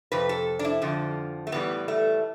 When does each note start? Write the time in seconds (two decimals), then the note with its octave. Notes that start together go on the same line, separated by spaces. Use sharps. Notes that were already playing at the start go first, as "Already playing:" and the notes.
0.12 F2 C3 B4
0.29 A4
0.59 D4
0.65 E4
0.82 F2 D3 F3
1.47 A3
1.52 A2 E3 G3 B3
1.88 A3